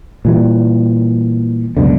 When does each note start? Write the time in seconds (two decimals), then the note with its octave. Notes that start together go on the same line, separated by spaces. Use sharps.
0.25 A#2 E3 G3
1.77 C#2 F#2 B2 D3